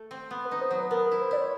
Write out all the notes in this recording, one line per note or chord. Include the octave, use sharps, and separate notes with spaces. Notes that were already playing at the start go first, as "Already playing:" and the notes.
Already playing: A3
C4
B3
B4
D#4
C5
F#3
B4
B3 A#4
E4 A#4
C5
E4 D5
C#5